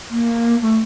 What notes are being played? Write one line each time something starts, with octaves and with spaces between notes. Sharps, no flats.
A#3
A3